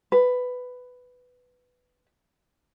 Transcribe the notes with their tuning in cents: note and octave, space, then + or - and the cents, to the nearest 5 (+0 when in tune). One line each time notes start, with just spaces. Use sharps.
B4 +10